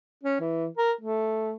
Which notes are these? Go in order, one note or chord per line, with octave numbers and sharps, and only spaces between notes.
C#4
E3
A#4
A3